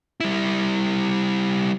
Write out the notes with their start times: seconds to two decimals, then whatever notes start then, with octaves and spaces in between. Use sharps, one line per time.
0.20 G3 E4